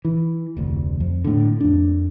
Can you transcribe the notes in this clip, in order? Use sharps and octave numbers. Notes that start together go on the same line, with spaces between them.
E3
F1 D2
F2
A2 D3
F2 D4